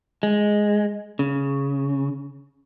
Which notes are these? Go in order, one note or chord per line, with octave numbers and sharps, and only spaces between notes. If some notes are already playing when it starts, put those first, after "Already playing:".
G#3
C#3